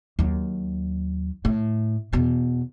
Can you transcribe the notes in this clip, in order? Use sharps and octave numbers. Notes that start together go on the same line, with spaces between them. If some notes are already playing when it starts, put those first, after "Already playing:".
D#2 F#3
A2
E2 B2